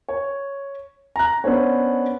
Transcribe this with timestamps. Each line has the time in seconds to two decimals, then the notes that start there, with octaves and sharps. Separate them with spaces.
0.09 C#5
1.16 A#5 F#6
1.44 B3 C#4 D4 C5 C#5